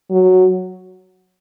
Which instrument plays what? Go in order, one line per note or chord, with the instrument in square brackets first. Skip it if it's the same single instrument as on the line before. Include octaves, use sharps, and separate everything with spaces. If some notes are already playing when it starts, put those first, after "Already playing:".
[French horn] F#3